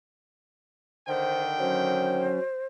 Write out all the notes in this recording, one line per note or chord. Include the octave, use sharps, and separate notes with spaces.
D3 D#3 C5 G5
F#3 C#4 C5